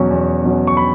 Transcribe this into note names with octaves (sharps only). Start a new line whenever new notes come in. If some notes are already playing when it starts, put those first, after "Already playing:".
Already playing: E2 B2 F#3 C#4
E2
B2 F#3 C#4
C#6
B5